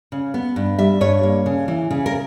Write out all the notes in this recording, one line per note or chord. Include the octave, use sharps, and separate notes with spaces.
C#3
B3
G2
G3 E5
G2 C#5
A#3
C#3
E3
C#3
A#4